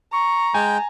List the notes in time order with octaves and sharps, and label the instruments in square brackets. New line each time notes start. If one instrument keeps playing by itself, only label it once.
[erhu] A#5 [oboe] C#6
[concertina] G#3 G5 [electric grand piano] G#5